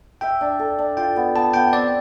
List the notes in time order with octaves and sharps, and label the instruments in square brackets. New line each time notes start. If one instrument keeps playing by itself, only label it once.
[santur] E5 [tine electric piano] G5
[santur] D4
A4
D4
[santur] F4 [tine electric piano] G5
[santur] B3
[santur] B3 [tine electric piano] A5
[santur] B3 [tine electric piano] G5
[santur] C4 [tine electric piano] D5